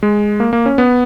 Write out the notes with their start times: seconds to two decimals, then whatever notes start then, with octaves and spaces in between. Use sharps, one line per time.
0.03 G#3
0.40 A#3
0.53 A#3
0.66 C#4
0.78 B3